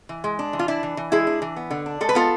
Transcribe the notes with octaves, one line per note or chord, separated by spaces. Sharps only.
E3
G#3
D4
E3
F4
D4 E4
E3
E3
G#3 E4 G#4
D4
E3
B3
D3
D4
G#3 A4
B4
B3 F4 A4